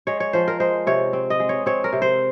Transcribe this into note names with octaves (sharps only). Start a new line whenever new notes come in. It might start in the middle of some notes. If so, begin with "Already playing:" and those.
G#3 C#5
C#5
F3 C5
A#4
G#3 C5
C3 C#5
C4
D#5
G#3
C#5
C4 C#5
A#4
C3
C5